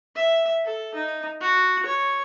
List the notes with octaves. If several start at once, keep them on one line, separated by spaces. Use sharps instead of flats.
E5
A4
D#4
F#4
C#5